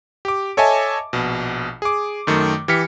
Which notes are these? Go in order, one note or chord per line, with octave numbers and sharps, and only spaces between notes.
G4 D6
A4 C#5 D#5 E5 G#5 A5
A#1 B2
G#4 D6
F#2 D#3 A3
E3 G4 F6 B6 C#7